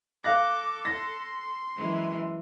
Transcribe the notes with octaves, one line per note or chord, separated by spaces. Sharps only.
A4 F5 D6 F#6 A#6
C6 A#6
F#2 E3 G#3